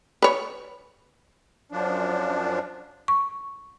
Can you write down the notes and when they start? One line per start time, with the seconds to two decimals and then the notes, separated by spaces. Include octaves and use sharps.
0.22 B4 C#5
1.72 F#2 F3 D4
3.08 C#6